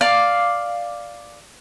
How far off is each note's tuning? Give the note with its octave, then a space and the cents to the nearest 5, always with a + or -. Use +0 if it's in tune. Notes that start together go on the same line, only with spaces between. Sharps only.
D5 +0 F5 +0